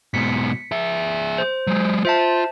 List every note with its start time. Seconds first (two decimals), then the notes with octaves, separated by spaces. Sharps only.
0.14 G#2 B2 B6 C#7
0.72 G#4 E5
1.38 C5
1.67 F#3 G#3
2.05 F4 C5 E5 A5